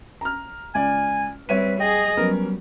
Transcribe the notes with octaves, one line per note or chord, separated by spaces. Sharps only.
A#5 F6
C#2 D5 G#5
G3 C4 B4 C#5 E5 D#7
G#4 D#5 G5
F#3 G3 B3 C#4 A#4